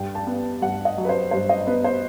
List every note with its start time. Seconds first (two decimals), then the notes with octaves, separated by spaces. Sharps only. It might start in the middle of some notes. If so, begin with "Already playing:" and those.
Already playing: G2 G5
0.15 A5
0.27 B3
0.62 G2 F#5
0.85 D#5
0.97 F#3
1.05 B4
1.09 C5
1.31 G2 C5
1.49 D#5
1.67 B3 B4
1.84 C5